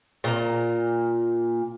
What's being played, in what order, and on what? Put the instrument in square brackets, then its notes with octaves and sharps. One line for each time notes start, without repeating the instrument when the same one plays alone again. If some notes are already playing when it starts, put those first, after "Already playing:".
[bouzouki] A#2 A#5